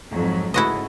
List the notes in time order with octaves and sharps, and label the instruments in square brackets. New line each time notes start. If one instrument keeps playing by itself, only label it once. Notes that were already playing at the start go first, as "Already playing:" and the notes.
[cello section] F2 G#2 F#3
[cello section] G#2 C#3 A3 [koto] E4 F#4 D#5